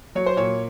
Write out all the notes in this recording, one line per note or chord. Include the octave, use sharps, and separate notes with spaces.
F#3 C#5
C5
A#2 C#5